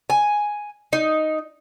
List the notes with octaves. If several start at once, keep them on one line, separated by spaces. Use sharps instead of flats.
G#5
D#4